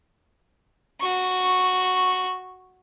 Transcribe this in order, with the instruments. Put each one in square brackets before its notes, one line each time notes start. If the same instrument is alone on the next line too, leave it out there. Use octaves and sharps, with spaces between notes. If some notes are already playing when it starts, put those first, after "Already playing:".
[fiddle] F#4 C#6